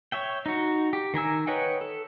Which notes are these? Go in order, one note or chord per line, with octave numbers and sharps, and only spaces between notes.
C#5 E5 G5
D#4 F#4
G4
D#3 A#4 G#5 E6
B4 C#5 D#5 F#5 G5
A4